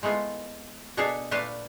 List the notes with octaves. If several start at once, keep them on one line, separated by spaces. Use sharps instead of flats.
G#3 A3 B3 E4 F4
B2 D4 G#4 A4 E5 F5
A#2 A3 D4 B4 F5 A5